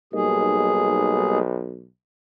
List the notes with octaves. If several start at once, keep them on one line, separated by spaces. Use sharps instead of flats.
B1 G3 A#3 D#4 G#4